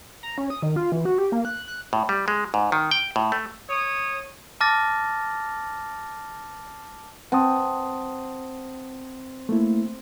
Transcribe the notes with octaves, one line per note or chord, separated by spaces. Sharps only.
A#5
C#4
D#6
D#3
F4
E3
F#4
G4
A#3
F#6
F#6
A2
G3
G#3
G#2
D#3
G5
A2
A3
C#5 D#6
A5 D6 F6 A6 A#6
C4 F#5 A5 D#6
A3 A#3 E4